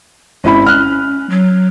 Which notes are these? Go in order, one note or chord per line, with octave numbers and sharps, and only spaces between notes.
G#1 C#4 E4 B5
F6 F#6
F#3